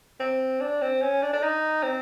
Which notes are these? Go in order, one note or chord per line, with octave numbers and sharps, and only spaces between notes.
C4
D4
C4
C#4
D4
D4
D#4
C4